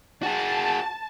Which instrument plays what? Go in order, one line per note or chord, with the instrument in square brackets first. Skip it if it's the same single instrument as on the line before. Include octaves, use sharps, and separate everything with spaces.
[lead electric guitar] F#4 G#4 [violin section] A5